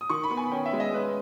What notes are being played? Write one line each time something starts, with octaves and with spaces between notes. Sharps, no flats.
D#6
D#3 C#6
B5
B3
G#5
C#4 G5
E5
G#3
D#5
C#4 B4